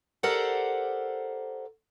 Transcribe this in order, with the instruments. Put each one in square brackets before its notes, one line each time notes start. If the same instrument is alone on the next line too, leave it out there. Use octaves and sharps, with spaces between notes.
[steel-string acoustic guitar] G4 A4 A#4 C5 D5 F#5